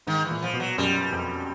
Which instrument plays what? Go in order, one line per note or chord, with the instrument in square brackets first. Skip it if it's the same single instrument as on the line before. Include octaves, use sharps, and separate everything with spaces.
[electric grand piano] G#2 [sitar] D#3
[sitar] E3
[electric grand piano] A#2
[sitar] F3
[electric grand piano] B2
[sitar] F#3
[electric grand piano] F#2 [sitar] G3
[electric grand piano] F2